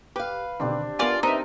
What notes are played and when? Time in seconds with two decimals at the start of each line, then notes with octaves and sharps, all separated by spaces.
0.16 G4 B4 F5
0.60 B2 D3 D#3 C4 D4 G4
0.99 B3 F4 A#4 D5 G#5
1.23 C4 D#4 A#4 B4 D#5 E5